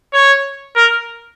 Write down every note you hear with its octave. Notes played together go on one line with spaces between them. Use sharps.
C#5
A#4